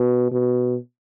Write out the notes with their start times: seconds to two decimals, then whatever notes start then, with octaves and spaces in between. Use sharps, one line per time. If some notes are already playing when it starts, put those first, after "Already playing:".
Already playing: B2
0.31 B2